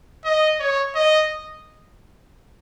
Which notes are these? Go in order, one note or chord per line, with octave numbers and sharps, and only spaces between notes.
D#5
C#5
D#5